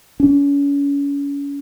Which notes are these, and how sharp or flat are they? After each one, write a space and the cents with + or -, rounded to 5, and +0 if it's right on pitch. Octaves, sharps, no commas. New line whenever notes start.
C#4 +35